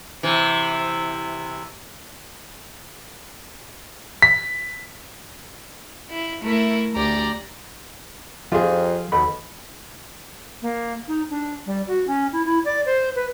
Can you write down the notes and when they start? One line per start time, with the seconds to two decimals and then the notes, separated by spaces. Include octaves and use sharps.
0.23 C3 E3
4.22 B6
6.10 E4
6.42 A3 E4 A#4
6.95 D2 G4 D5 A#5
8.52 F2 F3 F4 G4 G#4 C5
9.12 D#2 B2 A4 B5
10.62 A#3
11.08 D#4
11.30 D4
11.66 G3
11.88 F#4
12.07 C#4
12.33 E4
12.45 E4
12.65 D5
12.86 C5
13.15 B4